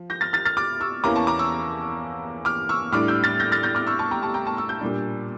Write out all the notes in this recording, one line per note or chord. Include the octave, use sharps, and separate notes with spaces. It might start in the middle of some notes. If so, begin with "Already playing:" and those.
Already playing: F3
G6 A#6
F6 A6
F6 A6
F6 A6
D6 F6
C#6 E6
E2 E3 A#3 C#4 A#5 D6
A5 C#6
A#5 D6
C#6 E6
D6 F6
C#6 E6
A2 G3 D4 D6 F6
E6 G6
F6 A6
G6 A#6
F6 A6
G6 A#6
D6 F6
C#6 E6
A5 C#6
G5 A#5
A5 C#6
G5 A#5
A5 C#6
C#6 E6
E6 G6
A#2 G3 D4